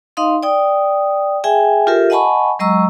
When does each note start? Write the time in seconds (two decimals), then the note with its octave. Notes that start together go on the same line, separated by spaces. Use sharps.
0.17 D#4 D#5 F5 C6 D#6
0.43 D5 G5 D#6
1.44 G#4 E5 G5 G#5
1.87 F4 G4 A4 A#4 E5
2.10 D#5 F#5 G#5 A5 B5 C#6
2.59 F#3 G#3 D#5 A#5 C#6 E6